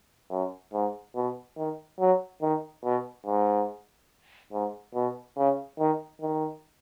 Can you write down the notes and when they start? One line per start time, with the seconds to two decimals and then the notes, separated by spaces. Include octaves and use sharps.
0.31 F#2
0.73 G#2
1.15 B2
1.57 D#3
2.00 F#3
2.42 D#3
2.84 B2
3.26 G#2
4.52 G#2
4.95 B2
5.37 C#3
5.79 D#3
6.21 D#3